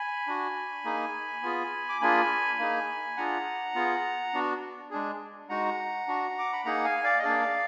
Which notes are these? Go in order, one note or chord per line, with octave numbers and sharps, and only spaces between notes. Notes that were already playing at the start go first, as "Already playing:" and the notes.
Already playing: G#5 B5
D4 F#4
A#3 D#4 G#4
B3 F4 G#4
D6
A#3 D4 F4 G#4 G#5 B5
A#3 D#4 G#4
D4 F4 G#4 F#5 A#5
B3 F4 G#4
B3 D4 F#4
G#3 D4 G#4
G#3 D#4 F#4 F#5 A#5
D4 F#4
D6
B5
A#3 D#4 G#4 F#5 A#5
F5 G#5
D5 F5
D#5
A#3 D4 G#4 D5 F5